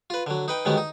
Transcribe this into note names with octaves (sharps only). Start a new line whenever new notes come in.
F4 B4
D3 F#3
D#4 B4 G5
G#2 D3 D#3 F#3 G3 B3
D#4